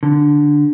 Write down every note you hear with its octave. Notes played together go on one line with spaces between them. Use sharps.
D3